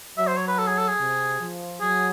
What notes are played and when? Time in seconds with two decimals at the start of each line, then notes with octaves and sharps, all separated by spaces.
0.18 F#3 E5
0.27 C5
0.37 C#5
0.48 B4
0.59 A4
0.68 G#4
0.78 A4
0.88 G#4
0.99 C3
1.40 F3
1.81 F#3 G#4